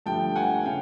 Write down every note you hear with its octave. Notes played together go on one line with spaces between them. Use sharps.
G2 D3 F3 A3 G5 A5
F#5 G#5
C#3 F5 G5